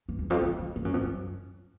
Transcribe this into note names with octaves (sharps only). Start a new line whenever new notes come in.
G2
E2
F2
E2
F2
G2
F#2
F2
F#2